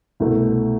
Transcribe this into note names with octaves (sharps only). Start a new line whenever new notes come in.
C2 B2 A3